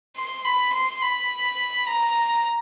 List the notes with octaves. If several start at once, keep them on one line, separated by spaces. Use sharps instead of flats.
C6
B5
C6
B5
A#5